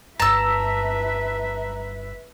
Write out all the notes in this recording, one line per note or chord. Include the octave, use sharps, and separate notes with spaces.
G1 G2 B4 E5 A5 A#5 E6 A#6